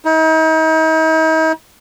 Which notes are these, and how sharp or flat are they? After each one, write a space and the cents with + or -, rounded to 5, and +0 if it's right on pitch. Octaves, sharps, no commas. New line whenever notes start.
D#4 +40